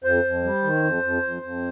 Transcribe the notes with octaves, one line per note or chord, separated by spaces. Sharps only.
F2 C5
F2
G3
D#3
F2
F2
F2
F2